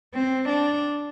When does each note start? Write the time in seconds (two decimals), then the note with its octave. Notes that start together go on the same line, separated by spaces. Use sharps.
0.14 C4
0.49 D4